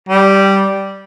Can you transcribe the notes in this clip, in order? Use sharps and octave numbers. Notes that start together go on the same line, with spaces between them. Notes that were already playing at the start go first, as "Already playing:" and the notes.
G3